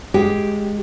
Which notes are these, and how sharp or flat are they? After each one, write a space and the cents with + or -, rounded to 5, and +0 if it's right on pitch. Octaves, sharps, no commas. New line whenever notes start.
G#3 +0 G4 +0